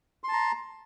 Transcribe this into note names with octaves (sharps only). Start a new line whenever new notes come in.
A5 A#5 C6